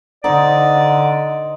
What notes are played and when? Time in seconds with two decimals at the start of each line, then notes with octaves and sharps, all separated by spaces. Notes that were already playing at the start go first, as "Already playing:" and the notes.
0.24 D3 D#4 C5 D5 D#5 F#5